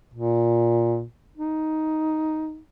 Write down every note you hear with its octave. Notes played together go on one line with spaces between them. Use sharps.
A#2
D#4